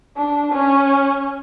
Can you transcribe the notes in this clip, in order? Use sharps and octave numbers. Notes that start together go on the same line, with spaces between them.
D4
C#4